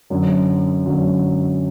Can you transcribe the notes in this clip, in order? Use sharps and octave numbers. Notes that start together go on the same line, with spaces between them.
F#2 D3 F#3
F#2 D3 F#3